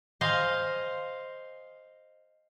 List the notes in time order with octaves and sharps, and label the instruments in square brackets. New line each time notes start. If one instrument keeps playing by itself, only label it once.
[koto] C5 D#5 F5 G#5